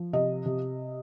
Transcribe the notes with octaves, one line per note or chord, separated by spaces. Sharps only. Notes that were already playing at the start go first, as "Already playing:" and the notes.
Already playing: F3
C3 D#5
C3